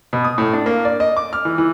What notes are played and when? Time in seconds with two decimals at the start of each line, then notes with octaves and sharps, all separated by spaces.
0.13 B2
0.25 D#6
0.38 A2
0.53 D4
0.66 A#3
0.85 D5
1.00 D#5
1.17 D6
1.33 F6
1.45 E3
1.58 E3